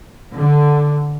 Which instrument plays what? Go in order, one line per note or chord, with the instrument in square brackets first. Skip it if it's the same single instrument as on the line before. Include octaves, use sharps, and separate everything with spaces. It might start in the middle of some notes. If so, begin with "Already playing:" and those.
[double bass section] D3